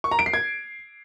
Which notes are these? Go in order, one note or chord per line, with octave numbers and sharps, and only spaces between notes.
C#6
A#5
D7
C7
G#6